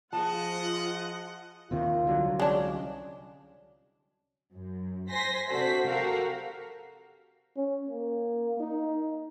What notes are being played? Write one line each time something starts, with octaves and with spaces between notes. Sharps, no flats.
F3 F4 G#4 D#5 F#5 A5
D#2 C3 D#3 F4
C2 D3 F#3
G#3 C#4 D4
F#2
C5 G#5 C6 A#6 B6
C3 D4 F#4 A4 C5 B6
F#4 G4 A4 A#4 F5 F#5
C#4
A#3
D#4